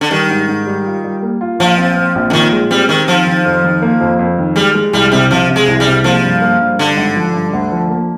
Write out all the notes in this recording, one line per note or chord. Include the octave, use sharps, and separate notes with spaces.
D3
D#3 G3
G#2
G#2
G3
F4
G3
A#3
F4
A#1 F3
C4
C4
A#1
D3
A#2 D#3
G#3
G3 C4
D#3 C4
D#3 F3
D#3
F2
D#3
A#3
F2
F2
D#3
G3 G#3
G#3
C2 G3
C3 G3
C3 F3
C3
G#3
C2
G3
C3
F3 A#3
G2
A#3
G2
G2 D3
G#1
F3
G2
D2
F3
A#3